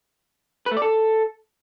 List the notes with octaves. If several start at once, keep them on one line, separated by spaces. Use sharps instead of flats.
B4
A3
D5
A4